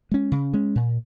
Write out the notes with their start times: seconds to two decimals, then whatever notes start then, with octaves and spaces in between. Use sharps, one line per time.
0.12 G#3 C#4
0.32 C#3
0.54 G#3 C#4
0.76 A#2